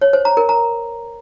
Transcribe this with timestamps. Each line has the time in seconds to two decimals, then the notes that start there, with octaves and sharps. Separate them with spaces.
0.02 C#5
0.13 C5
0.25 A#5
0.37 A#4
0.49 A#5